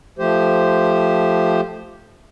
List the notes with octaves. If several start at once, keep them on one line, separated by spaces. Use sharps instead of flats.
F3 A3 G4 C5